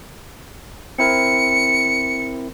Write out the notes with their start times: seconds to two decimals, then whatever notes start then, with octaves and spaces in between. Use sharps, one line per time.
0.99 C4 E4 A#4 C#7